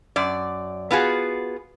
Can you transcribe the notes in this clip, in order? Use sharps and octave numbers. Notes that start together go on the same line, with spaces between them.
F#2 D5
B3 F4 F#4 G#4